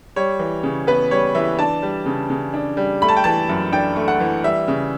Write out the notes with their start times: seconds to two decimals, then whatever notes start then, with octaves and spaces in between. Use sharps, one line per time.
0.16 G3 C#5
0.39 E3
0.63 C#3
0.87 B3 B4
1.11 G3 C#5
1.35 E3 E5
1.59 D4 A5
1.82 G3
2.06 C#3
2.30 C#3
2.54 D4
2.77 G3
3.02 A3 B5
3.08 A5
3.17 G5
3.24 E3 A5
3.49 F#2
3.72 D4 G5
3.96 A3
4.08 F#5
4.20 E3
4.43 G3 E5
4.68 C#3